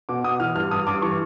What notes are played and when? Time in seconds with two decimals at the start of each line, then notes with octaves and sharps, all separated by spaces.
0.09 B2 D6
0.24 B2 D#6
0.40 E3 F6
0.56 G2 F6
0.71 G2 D#6
0.87 G2 D6
1.02 E3 C#6